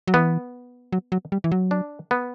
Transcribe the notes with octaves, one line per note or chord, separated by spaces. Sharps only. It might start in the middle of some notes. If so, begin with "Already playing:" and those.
F#3
E3 B3
F#3
F#3
G3
E3
F#3
D4
B3